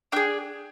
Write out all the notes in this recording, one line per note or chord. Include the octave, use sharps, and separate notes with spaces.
D4 G#4 G5